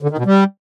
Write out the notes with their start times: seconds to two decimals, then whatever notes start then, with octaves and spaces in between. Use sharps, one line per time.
0.02 D3
0.10 D#3
0.18 B2
0.26 G3